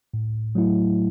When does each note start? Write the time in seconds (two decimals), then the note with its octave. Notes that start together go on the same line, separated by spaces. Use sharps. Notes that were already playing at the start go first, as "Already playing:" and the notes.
0.14 A2
0.55 F#3 A3 E4